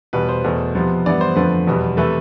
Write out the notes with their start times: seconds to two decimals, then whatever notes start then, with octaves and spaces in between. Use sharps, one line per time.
0.13 E2 B2 G3 B4
0.29 C5
0.44 E2 B2 A3
0.75 C3 F3 B3
1.05 G2 E3 G3 B3 D5
1.21 C5
1.36 F2 D3 F3 A3 B4
1.67 E2 B2 G3 B3
1.97 C3 E3 A3 B4